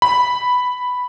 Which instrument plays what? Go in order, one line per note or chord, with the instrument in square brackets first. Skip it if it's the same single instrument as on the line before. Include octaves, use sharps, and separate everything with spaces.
[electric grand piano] B5